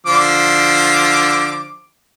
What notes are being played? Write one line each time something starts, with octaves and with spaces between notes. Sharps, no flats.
D3 F3 D6